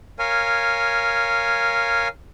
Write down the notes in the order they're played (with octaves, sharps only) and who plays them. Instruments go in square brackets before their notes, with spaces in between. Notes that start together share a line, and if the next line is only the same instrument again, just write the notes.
[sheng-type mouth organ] A#4 C#5 F5 G#5